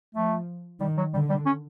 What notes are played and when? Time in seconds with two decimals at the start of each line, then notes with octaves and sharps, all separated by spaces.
0.15 F3 A3
0.80 D#3 G3
0.97 F#3
1.14 D3 G3
1.29 G3
1.46 C#4